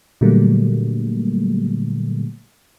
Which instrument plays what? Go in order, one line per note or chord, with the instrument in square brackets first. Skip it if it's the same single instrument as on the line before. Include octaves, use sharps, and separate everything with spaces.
[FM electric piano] A#2 D3 F#3 G3 A3 A#3